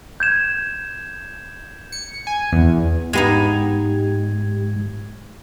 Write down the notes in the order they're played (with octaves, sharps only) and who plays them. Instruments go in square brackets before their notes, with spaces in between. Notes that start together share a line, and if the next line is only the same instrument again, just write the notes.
[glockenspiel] G6 G#6 E7
[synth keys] C#7
G#5
E2
[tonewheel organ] G#2 [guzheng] G#3 B3 D#4 [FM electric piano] G4 G#6